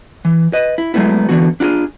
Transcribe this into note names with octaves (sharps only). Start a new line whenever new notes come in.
E3
B4 D#5
E4
F#3 G#3 A3 B3 E4
D3 E3 B3 F#4
D4 F4 F#4 G#4